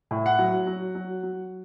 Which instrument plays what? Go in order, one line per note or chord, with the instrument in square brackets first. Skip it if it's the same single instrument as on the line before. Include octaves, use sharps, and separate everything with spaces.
[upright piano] A2
F#5
F#3
F#3
F#3
F#3